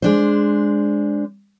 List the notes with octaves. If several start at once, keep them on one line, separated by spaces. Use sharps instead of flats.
G#3 D4 C5